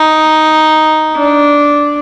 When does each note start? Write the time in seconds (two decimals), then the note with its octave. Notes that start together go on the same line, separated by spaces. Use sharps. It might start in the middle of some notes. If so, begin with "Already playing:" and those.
Already playing: D#4
1.17 D4